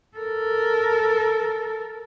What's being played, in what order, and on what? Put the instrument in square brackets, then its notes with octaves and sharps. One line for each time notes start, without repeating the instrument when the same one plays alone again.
[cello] A4 A#4